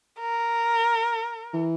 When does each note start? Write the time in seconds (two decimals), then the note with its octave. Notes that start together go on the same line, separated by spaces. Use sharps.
0.21 A#4
1.54 E3